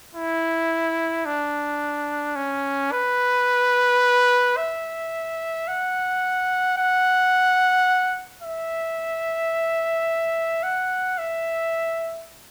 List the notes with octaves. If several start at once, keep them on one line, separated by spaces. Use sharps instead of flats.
E4
D4
C#4
B4
E5
F#5
F#5
E5
F#5
E5